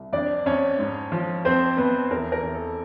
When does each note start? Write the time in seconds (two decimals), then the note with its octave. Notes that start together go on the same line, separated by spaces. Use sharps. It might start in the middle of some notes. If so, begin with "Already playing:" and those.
Already playing: C2
0.13 F2 D4 D5
0.46 F2 C#4 C#5
0.79 G#2
1.12 F3
1.45 F2 C4 C5
1.77 F2 B3 B4
2.11 E2 A#4
2.32 A#4
2.43 E2
2.54 A4